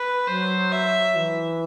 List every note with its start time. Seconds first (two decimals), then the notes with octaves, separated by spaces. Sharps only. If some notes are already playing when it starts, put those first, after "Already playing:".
Already playing: B4
0.27 F#3 C5
0.72 E5
1.16 E3